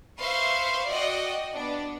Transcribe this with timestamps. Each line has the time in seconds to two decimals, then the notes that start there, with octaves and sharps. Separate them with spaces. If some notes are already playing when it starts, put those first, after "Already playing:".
0.19 B4 C5 E5 F5 C6 C#6
0.88 F#4 D5 D#5 F#5 G5
1.54 B3 D4